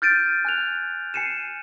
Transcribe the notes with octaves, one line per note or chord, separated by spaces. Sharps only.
F6 G6 A6 D7 D#7
G#5 F#6 F7
G#5 C7 C#7 D#7 E7